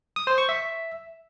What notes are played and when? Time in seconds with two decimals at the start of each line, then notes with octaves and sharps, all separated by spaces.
0.16 D#6
0.27 C5
0.38 C#6
0.49 E5